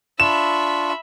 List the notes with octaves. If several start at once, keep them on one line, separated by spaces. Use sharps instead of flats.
D4 F4 E5 B5 C#6 E7